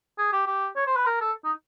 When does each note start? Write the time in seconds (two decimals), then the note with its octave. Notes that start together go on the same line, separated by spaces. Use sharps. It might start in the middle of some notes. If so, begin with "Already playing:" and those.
0.18 G#4
0.33 G4
0.47 G4
0.76 C#5
0.87 C5
0.96 B4
1.05 A#4
1.21 A4
1.45 D#4